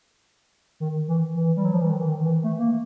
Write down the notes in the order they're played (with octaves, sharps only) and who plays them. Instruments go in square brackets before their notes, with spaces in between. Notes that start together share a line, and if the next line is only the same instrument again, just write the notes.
[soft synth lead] D#3
E3
E3
G3
F#3
F3
E3
D#3
E3
D#3
D#3
E3
A3
A#3